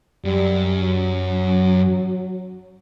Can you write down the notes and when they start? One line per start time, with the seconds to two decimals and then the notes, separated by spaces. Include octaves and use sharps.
0.25 F#2 G3
0.81 F#3